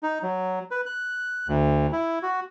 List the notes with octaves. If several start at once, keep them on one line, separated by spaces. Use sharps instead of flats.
D#4
F#3
B4
F#6
D2
E4
F#4